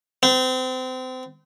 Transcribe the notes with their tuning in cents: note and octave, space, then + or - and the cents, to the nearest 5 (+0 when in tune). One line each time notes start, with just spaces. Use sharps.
C4 -30